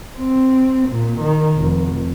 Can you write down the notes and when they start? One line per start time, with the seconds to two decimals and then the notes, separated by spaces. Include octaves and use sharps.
0.19 C4
0.89 A#2
1.21 D#3
1.57 F1